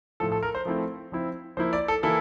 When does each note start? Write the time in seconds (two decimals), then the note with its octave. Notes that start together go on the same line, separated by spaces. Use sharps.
0.20 A2 F3 A3 A4
0.32 A4
0.43 A#4
0.55 C5
0.65 F3 A3 C4 E4
1.12 F3 C4 E4
1.57 F3 A#3 E4 C5
1.73 D5
1.88 A4
2.03 E3 A#3 E4 A4